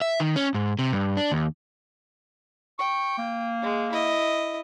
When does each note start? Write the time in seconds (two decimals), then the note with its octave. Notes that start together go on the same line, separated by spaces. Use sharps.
0.01 E5
0.20 D#3
0.36 C#4
0.55 G#2
0.79 C3
0.92 G2
1.17 D4
1.32 D#2
2.79 G5 C#6
3.18 A#3
3.62 G#3
3.92 E4 D#5